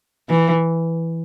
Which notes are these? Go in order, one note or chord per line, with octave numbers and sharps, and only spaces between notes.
E3